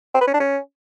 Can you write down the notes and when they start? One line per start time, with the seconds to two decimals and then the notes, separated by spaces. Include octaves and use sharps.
0.14 C4
0.21 B4
0.27 C#4
0.34 D4
0.40 C#4